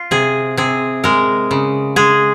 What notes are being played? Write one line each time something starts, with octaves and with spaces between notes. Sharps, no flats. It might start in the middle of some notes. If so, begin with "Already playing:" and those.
Already playing: F4
C3 G#4
C3 G#4
G#3 A#4
C#3
G#3 G#4